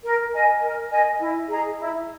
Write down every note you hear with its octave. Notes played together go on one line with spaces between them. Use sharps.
A#4
D#5 G#5
A#4
D#5 G#5
E4
G#4 D#5 A#5
E4